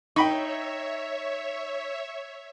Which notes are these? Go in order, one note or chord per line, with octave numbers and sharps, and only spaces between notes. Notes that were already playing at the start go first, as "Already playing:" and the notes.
D#4 C#5 E5 G5 B5 C#6